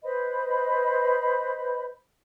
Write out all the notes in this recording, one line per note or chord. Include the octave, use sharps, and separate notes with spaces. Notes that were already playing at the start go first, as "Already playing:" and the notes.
B4 C5 D#5 B5